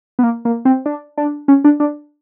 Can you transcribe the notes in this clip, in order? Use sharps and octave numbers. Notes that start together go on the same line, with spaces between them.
B3
A#3
A#3
C4
D4
D4
C#4
D4
D4